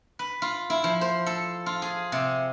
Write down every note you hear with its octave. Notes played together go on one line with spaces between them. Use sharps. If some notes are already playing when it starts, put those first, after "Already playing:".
B4
F4
E4
F3
C5
A4
F4
G#4
C3